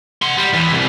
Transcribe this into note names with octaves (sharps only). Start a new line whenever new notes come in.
F#5 C6
G3
E2 E3
C2